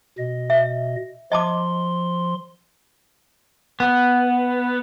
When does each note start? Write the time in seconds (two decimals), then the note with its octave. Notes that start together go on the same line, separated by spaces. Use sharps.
0.18 B2 D#5
0.50 E5
1.32 F3 D#5 A5 C6 D6
3.80 B3